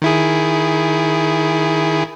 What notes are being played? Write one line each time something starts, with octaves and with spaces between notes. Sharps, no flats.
D#3 E4 G#4